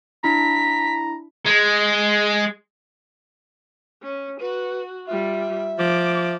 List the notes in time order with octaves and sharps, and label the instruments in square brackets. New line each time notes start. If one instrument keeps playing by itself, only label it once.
[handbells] D4 E4 [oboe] A#5 [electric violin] B6
[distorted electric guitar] G#3
[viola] C#4
[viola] F#4 [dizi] B4
[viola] G3 F4 [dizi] E5
[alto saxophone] F3 [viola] D6